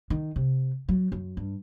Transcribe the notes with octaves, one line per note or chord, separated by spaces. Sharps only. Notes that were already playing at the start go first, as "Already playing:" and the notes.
D#3
C3
F#3
F#2
G2